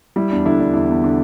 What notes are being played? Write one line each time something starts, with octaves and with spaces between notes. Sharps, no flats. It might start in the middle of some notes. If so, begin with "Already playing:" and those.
G3 E4
E2 D4
D3 E4
E2 D4
E2 E4
E2
D3